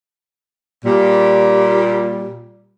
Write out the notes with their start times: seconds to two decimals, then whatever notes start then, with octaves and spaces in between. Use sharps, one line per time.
0.85 A#2 G3